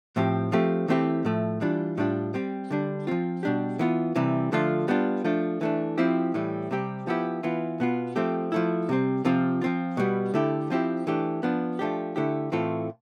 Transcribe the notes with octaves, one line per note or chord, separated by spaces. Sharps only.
A2 F3 C4 G4
F3 A3 C4 G4
E3 A3 C4 E4 G4
A2 F3 A3
E3 G3 D4 F4
A2 G3 D4 F4
G3 C4 G4
D3 G3 D4
F3 C4 F4
B2 G3 D4 G4
E3 B3 F4
C3 E3 G3
D3 F3 A3 D4 F4
G3 B3 D4 F4
F3 A3 D4
E3 A3 D4
F3 C4 E4 G4
A2 E3 G3
C3 G3 C4 G4
F3 B3 E4 G4
E3 B3 F4
B2 B3 F4
F3 A3 C4 G4
F3 A3 E4
C3 G3 C4
C3 F3 C4 F4
F3 C4 F4
B2 G3 B3
D3 A3 E4 G4
F3 C4 E4 G4
E3 A3 D4 G4
F3 B3 D4
F3 A3 D4 G4
D3 A3 E4 G4
A2 E3 A3 C4 F4